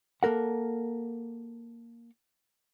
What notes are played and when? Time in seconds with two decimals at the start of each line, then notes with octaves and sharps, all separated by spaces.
0.23 A#3 A4 A#4 F#5